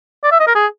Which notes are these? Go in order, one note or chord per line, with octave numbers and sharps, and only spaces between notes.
D5
E5
D#5
A#4
G#4